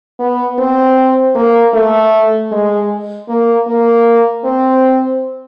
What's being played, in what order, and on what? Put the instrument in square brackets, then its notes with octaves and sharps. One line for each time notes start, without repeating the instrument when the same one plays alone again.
[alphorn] B3
C4
A#3
A3
G#3
A#3
A#3
C4